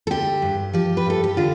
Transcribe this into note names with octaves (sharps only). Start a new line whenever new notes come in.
A4
D3 G4
G2
F3 G4
B4
G2 A4
G4
D3 F4